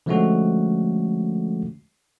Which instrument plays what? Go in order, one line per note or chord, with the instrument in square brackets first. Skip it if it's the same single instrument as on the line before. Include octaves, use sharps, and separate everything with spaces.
[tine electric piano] D3 F3 G#3 A3 C#4 F#4